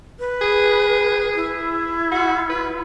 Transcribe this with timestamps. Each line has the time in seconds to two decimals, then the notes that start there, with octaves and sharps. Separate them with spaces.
0.19 B4
0.42 G#4
1.35 E4
2.11 F#4
2.49 B4